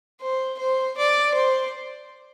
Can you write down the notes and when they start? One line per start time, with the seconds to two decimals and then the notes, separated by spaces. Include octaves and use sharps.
0.21 C5
0.59 C5
0.97 D5
1.34 C5